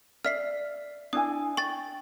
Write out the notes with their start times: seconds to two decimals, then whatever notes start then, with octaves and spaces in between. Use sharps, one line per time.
0.25 D5 E5 F6 B6 C7
1.13 D4 E4 G#5 D#6
1.57 G5 C#6 A6